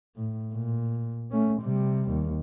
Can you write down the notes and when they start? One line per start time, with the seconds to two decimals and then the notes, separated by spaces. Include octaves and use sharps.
0.16 A2
0.53 A#2
1.31 A3 C#4
1.61 C3 G3
2.10 D#2